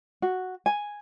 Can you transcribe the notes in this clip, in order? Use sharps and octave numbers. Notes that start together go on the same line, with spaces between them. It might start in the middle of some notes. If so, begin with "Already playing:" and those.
F#4
G#5